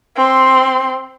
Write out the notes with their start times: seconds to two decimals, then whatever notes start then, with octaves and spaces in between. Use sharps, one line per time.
0.17 C4 C6